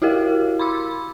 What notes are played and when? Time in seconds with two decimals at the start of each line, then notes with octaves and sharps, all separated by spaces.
0.02 E4 F#4 G4 A#4 F5
0.59 B5 C6 D6 E6